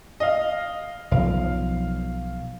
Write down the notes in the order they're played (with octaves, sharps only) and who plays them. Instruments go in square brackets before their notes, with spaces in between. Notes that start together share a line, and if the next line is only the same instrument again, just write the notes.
[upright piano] D#5 F5
[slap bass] B1 F3 [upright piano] F5